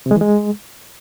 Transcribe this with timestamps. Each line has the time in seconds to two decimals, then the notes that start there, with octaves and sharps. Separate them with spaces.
0.06 C3
0.11 G#3
0.16 E3
0.21 G#3